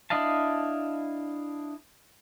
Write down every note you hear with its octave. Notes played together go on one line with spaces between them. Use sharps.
D4 E4 D#5 F5 A5